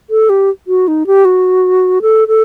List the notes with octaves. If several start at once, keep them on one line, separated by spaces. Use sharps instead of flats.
A4
G4
F#4
D#4
G4
F#4
A4
A4